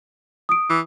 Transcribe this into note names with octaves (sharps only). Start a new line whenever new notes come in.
D#6 D7
E3